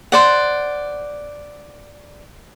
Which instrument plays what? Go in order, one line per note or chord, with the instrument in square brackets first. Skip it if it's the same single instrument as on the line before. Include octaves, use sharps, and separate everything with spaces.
[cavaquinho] C5 D5 F#5